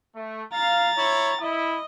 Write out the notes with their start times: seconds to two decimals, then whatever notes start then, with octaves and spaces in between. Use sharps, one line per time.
0.16 A3
0.53 F5 A#5 A6
0.97 E4 C#5
1.41 E4 D#5